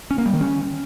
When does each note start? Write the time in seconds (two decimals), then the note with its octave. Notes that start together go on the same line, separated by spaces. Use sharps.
0.11 C#4
0.18 A#3
0.26 G3
0.33 D#3
0.41 C#4